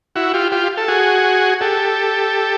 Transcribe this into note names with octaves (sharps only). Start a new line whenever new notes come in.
E4 F#4
F4 G4
F4 G4
A4
F#4 G#4
G4 A4